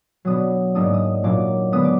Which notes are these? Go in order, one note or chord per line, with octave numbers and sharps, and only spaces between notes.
B2 F#3 B3 D4 D#6
G#2 F#3 A#3 D4 D#6
D#6
A#2 F#3 A#3 D4 D6
D3 G#3 B3 D#6
D6